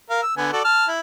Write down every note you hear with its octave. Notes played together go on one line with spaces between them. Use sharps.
A#4 F5
E6
D3 B3 G#5
F#4 A4 D5
A5 F6
E4